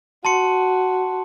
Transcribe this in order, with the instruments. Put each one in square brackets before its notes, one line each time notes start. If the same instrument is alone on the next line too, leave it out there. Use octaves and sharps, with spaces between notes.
[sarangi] F#4 [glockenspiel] A5 C6 C#7